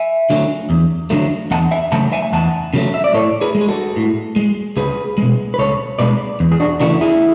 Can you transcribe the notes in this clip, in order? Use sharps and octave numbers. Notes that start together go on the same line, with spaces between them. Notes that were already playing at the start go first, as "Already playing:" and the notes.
Already playing: E5 G#5
D3 F#3 A3
E2
D3 F#3 A3
E2 F#5 A5
E5 G#5
C#3 F#3 A3 F#5 A5
E5 G#5
G#5
E2 F#5 A5
C#3 F#3 A3
E5
D5
A2 A4 C#5
G#4 B4
G#3
G#4
F#4 A4
A2
G#3
C#2 G#4 B4
B2 G#3
B4
C#2 A4 C#5
B2 G#3 B4 D5
E2
G#4
D4 F#4
C#3 E3 A3 D4 F#4
E4 G#4